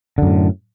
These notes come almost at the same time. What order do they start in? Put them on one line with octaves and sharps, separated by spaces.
D3 F#2 A2